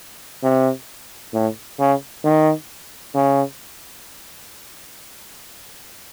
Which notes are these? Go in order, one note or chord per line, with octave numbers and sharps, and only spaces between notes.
C3
A2
C#3
D#3
C#3